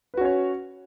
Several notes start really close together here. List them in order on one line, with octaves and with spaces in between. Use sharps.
B4 F#4 C#4 C#5